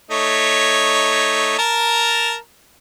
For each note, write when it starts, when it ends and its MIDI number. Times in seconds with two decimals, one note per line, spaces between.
0.11 1.55 57
0.11 1.55 63
0.11 1.55 73
1.59 2.35 70
1.59 2.35 81
1.59 2.35 82